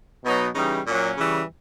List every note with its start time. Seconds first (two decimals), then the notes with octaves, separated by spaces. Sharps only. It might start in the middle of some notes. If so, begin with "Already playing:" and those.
0.24 B2 F#3 D#4
0.54 C#3 E3 G3 D#4
0.86 A#2 F#3 C#4
1.17 C#3 E3 G3